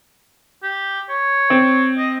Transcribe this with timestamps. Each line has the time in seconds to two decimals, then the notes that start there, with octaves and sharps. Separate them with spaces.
0.63 G4
1.09 C#5
1.50 C4
1.98 D#5